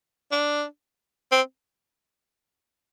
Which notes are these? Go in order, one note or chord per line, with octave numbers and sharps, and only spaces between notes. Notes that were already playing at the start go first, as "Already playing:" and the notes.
D4
C4